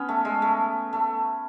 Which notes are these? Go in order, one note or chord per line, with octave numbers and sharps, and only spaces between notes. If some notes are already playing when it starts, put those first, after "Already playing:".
Already playing: B3 C#4
A3
G#3
A3
A3